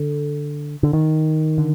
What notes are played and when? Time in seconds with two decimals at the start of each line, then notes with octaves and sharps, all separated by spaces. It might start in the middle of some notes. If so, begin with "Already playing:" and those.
Already playing: D3
0.83 D3
0.93 D#3
1.58 D3